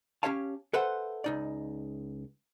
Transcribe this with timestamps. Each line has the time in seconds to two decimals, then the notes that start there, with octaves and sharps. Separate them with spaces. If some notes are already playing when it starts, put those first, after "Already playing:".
0.23 C#4 F4 G4 C#5 F5 A5
0.73 A4 B4 C5 E5 F#5
1.24 C#2 D#4 D5